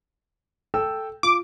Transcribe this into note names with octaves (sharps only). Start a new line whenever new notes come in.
A4 G5 E6
F4 D6